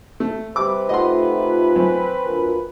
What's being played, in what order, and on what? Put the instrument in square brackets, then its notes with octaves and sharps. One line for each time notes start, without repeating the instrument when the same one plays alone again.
[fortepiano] A3
[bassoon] C3 [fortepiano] G3 D6 [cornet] B4
[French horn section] A3 D#4 F4 [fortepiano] D#5 F#5 C6
[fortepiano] F#2 [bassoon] C4
[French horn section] D2 F4 A#4